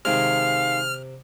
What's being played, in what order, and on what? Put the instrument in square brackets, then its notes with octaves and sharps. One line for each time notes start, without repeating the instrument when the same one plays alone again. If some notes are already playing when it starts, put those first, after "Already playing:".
[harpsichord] C3 [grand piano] D#3 G#3 [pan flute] F5 [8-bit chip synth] F6